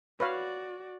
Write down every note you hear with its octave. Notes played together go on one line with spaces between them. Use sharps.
F#4 B4 C#5 D5 F5